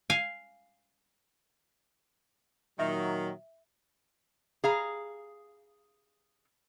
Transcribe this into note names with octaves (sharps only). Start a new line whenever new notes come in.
F5 G#5
A#2 D#3 F#3 E5
G#4 F5 A#5